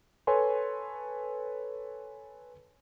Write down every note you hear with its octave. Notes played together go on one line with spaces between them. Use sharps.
A4 B4 C#5 G#5 C6